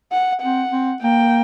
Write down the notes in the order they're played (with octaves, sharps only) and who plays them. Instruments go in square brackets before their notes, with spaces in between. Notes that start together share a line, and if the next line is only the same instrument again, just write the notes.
[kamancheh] F#5
[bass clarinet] C4 [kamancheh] F#5
[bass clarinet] C4
[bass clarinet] A#3 [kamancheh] G5